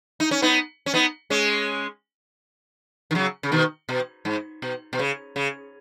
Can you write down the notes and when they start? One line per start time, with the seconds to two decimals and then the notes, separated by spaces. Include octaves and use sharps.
0.20 D#4
0.31 C#4
0.42 B3 D#4
0.86 C#4
0.94 B3 D#4
1.30 G#3 C#4
3.11 D#3
3.15 C#3 F#3
3.43 C#3
3.52 B2 D#3
3.89 B2
4.25 G#2
4.62 B2
4.93 B2
4.99 C#3
5.36 C#3